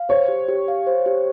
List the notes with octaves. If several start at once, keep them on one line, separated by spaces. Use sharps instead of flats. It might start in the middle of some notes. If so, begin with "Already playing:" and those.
Already playing: F5
C5 C#5
G4
G4
F5
C5
G4